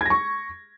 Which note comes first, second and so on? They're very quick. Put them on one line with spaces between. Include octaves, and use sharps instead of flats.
G#6 A#6 C#6